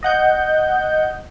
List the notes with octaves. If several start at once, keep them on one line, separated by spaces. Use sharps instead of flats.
D#5 F#5 G6